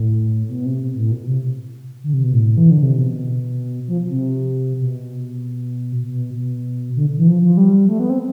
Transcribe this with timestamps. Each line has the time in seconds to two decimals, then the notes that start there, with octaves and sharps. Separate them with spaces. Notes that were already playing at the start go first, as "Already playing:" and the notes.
Already playing: A2
0.49 B2
0.65 C3
0.95 A2
1.12 B2
1.27 C3
2.04 D3
2.13 C3
2.24 B2
2.34 A2
2.57 E3
2.70 D3
2.83 C3
2.96 B2
3.88 F3
4.09 C3
4.81 B2
6.03 B2
6.34 B2
6.96 D3
7.17 E3
7.27 F3
7.42 F3
7.57 G3
7.89 A3
8.00 B3
8.10 C4